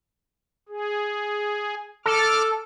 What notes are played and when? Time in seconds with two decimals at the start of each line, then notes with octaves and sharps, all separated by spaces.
0.69 G#4
2.06 A4 D6 F6